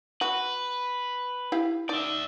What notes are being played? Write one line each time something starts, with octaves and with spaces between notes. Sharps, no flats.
F#4 B4
E4 G4 F5
D#4 D5 E5